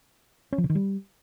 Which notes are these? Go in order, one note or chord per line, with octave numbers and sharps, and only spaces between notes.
C#4
F3
C#3
D#3
G3